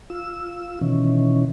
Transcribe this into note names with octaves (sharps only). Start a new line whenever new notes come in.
F4 E6
B2 D#3 E3 C#4